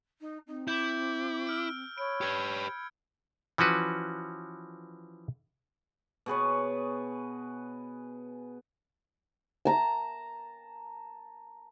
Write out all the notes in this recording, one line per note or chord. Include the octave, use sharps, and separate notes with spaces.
D#4
C4 D#4
E4 D6 G6
E6 F6 D7
C#5 B5 D7
G4 B4 G#6 C#7
E3 F3 C#4 F#4 B4
B2 G#4 B4 C#5
A5 A#5